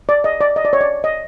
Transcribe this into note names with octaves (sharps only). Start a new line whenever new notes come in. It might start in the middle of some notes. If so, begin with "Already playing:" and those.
D5
D#5
D5
D#5
D5
C#5
D5
D#5